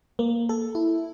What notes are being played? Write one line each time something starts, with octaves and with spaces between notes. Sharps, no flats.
A#3
A4
E4